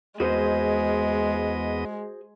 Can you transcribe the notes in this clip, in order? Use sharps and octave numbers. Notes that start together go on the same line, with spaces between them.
E2 G#3 B3 F#4 G#4 C5 D#5